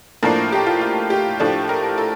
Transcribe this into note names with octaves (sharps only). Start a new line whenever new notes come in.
A2 F3 A#3 D4 A#4
G4
F4
F4
G4
A2 F3 A3 D4
A#4
A4